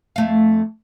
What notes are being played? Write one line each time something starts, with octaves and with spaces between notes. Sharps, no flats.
F2 A3 F5